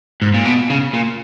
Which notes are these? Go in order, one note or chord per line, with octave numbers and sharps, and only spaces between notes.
G#2
A#2
B2
C#3
A#2